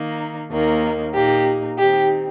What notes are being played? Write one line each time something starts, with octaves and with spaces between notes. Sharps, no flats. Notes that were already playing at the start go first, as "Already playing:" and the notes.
Already playing: D#3 A#3 D#4
D#2 D#3 A#3 D#4
A#2 A#3 D#4 G4
D#3 C4 D#4 G4